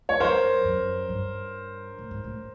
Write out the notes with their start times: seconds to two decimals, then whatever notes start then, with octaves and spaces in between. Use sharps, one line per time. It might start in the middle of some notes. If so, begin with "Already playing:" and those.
0.09 F2 C#5
0.20 F#2 A#4 C5
0.65 F#2
1.09 G2
1.99 A2
2.11 G#2
2.24 A2